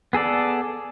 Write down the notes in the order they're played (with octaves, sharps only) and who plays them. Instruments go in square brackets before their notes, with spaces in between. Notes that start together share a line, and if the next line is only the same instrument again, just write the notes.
[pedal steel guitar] B3 G#4 A4 D5